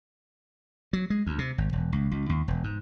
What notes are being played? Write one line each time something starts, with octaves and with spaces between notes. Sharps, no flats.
F#3
G#3
D2
C3
G#1
E1
C#2
C#2
D#2
E1
G#2